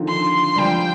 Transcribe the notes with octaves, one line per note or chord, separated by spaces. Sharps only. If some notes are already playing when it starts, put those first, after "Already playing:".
Already playing: D3 D#3 F3
C6
G3
F3 G5